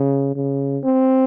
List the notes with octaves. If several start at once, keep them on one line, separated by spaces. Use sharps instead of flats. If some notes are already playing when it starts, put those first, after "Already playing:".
Already playing: C#3
C#3
C4